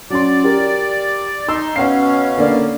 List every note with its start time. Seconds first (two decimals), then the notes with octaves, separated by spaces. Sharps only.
0.10 F#3 C#4 D5 C6
0.44 G4 A#4
1.49 D#4 C6 E6
1.76 B2 C#4 F5 F#5 C7
2.37 D3 A#3 D5